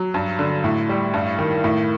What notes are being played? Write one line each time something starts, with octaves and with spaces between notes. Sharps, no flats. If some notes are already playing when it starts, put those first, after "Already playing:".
Already playing: F#3
G2
D3
A2
G3
G2
D#3
A2